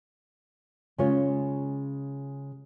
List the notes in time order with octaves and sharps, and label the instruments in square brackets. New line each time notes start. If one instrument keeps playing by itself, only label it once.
[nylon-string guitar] C#3 G#3 F4 C#5